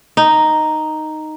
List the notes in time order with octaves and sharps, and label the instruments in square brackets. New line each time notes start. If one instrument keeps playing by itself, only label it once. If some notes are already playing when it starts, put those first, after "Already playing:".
[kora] D#4